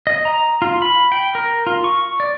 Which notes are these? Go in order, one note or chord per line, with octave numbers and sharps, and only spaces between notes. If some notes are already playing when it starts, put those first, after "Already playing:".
D#5
A#5
F4
B5
G5
A#4
F4
C#6
D5